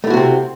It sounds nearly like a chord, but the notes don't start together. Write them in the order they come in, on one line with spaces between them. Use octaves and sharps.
A3 E4 F#4 C3 C4